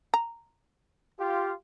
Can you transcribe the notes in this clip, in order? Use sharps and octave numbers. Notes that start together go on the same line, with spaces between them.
A#5
F4 G4